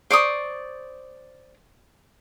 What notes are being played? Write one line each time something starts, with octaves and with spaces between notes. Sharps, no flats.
C5 D5 C#6 D#6